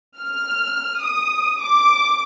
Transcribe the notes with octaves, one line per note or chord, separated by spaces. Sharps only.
F6
D#6
D6